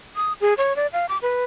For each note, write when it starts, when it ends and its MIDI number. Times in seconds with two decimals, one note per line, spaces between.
0.16 0.33 87
0.41 0.54 68
0.58 0.76 73
0.76 0.87 74
0.93 1.06 77
1.09 1.18 86
1.22 1.45 71